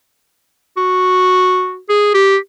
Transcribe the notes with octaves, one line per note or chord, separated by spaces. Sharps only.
F#4
G#4
G4